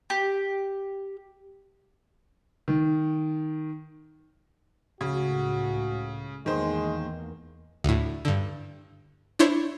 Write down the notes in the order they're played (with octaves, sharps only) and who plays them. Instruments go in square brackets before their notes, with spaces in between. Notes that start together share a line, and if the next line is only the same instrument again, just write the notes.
[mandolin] G4
[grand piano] D#3
[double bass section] C#2 A2 [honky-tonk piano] C#3 [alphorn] F#4
[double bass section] E2 A#3 [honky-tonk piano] D#3 C5 [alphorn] G#3
[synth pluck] D2 A2
G2 D3
D4 E4 C5 C#5